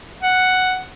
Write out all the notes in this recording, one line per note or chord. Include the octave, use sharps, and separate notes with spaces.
F#5